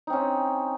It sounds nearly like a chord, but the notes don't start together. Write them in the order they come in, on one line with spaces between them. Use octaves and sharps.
D#4 C4 C#4